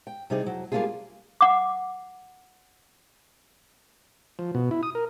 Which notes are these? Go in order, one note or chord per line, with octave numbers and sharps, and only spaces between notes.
G5
C3 G3 D#4 E4 G#4
F2 F#3
G3 A#3 C#4 D4 F4 G#4
F#5 D6
F3
B2
E4
D#6
A#4